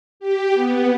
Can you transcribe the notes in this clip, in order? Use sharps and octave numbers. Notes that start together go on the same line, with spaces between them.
G4
B3